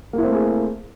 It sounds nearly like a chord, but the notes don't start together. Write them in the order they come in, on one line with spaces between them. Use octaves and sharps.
A#3 E4 C4 A3 G#4